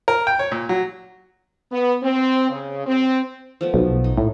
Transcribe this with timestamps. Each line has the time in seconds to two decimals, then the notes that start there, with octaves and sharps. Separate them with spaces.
0.08 A#4
0.27 G5
0.39 C#5
0.52 A#2
0.69 F#3
1.70 B3
2.02 C4
2.49 C#3
2.85 C4
3.61 F3 A3 B3
3.74 B1
4.04 D#4
4.18 A2